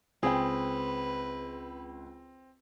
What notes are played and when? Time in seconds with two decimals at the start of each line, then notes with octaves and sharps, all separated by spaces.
0.23 C#2 C4 G#4 B4 G5